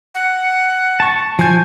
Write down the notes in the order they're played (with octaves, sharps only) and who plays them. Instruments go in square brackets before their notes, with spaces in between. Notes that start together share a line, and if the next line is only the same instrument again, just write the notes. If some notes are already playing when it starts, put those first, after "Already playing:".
[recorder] F#5
[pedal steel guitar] A5 C#6
[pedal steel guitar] F3 G6 [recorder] G#5